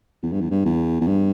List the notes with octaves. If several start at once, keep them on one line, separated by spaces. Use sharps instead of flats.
E2
G2
E2
G2
E2
E2
G2